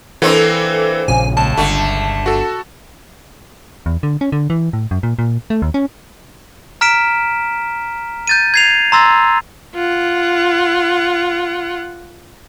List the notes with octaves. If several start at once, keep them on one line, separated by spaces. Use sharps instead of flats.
E3 A#3 C4 D4 A4
A#1 A#2 C#3 G#5
C#2 A5
G1 D3 A3
F#4 A4
E2
D3
C#4
D3
E3
A2
F#2
A#2
A#2
A3
D#2
C#4
A#5 F6 B6 D7 E7
G6 A6 D#7
G#6 C7 F7
A#5 C6 E6 A6 A#6
F4 F#5